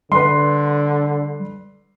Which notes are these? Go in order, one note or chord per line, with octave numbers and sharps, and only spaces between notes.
D3 G3 B4 C6